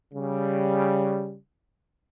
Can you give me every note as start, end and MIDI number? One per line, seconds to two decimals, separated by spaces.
0.14 1.37 49
0.14 1.37 55